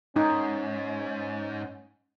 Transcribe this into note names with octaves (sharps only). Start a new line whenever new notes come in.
G#2 C#4 D#4